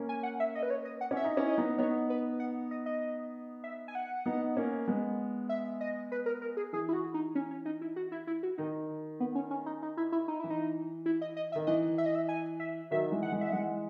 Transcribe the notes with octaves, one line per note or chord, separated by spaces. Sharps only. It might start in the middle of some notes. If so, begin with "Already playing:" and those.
Already playing: A#3 C#4
G#5
F#5
E5
D#5
B4
C#5
D#5
F#5
C#4
E5
D#4
C#4 E4
D#5
B3 D#4
B3 D#4 C#5
B4
F#5
D#5
D#5
E5
G#5
F#5
B3 D#4
A#3 C#4
G#3 B3
E5
D#5
B4
A#4
A#4
G#4
E3 G#4
E4
F#4
D#4
C#4
C#4
D#4
E4
F#4
E4
E4
F#4
D#3 D#4
B3
C#4
C#4
D#4
D#4
E4
E4
D#4
E3 E4
D#4
E4
D#5
D#5
E5
D#3
E3 D#5
E5
D#5
E5
G#5
E5
D#3 F#3 E5
E3 G#3
F#5
E3 G#3
E5
E3 G#3 F#5